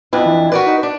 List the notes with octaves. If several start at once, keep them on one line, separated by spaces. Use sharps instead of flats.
F2 B3 D4 E4
E3
F#4 A#4 B4 D5
D#4
D4 D5